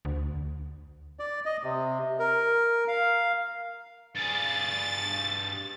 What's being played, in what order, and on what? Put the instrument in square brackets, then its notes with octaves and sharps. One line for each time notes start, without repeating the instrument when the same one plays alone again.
[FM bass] D2
[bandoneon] D5
D#5
C3
A#4
F5
[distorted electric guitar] G2 G#4 [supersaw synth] A6